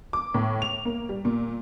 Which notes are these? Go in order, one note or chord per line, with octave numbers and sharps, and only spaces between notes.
D6
A2
F7
A#3
G3
A#2